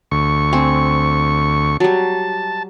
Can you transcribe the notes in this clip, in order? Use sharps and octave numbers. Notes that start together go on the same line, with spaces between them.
D2 C#6
C4 G#5
F#3 G3 A5